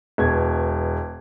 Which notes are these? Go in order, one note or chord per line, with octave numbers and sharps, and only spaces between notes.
E1 B2 G#6